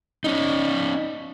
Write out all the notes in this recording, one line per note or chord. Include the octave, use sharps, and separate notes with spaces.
C#4 D#4